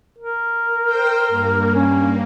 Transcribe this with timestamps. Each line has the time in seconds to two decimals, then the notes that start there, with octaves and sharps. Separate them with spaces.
0.18 A#4
0.85 C5 G5
1.28 G2 A#3
1.75 C#4